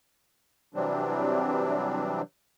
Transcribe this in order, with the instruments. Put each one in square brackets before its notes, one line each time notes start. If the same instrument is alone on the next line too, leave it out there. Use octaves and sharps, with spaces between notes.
[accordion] C3 E3 F#3 G3 C4 D4